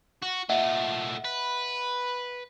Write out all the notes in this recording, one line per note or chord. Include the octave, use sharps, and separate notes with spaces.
F#4
A#2 A3 D#5 E5 F#5
B4